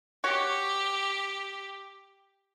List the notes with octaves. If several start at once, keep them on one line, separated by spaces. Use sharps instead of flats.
F#4 G4 C#5